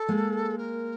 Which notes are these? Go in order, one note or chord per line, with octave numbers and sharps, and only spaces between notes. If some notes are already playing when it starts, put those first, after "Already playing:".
Already playing: A4
G#3 A#3
A#4